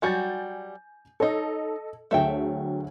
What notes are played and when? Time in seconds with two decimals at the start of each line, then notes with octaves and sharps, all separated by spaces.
0.02 F#3 G3 F#4 G#5 G6 A6
1.20 D#4 A4 C#5 D#5
2.11 D2 F#3 A3 G#4 E5 G5